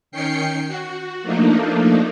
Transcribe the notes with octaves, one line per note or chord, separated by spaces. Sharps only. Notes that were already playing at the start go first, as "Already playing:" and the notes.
D#3 C#4 G5 C7 C#7
F#4
F3 A3 A#3 D4 D#4